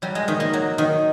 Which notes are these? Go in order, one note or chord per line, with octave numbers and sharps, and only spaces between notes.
F#3 G3
G#3
D#3
A#3
F#3
D#3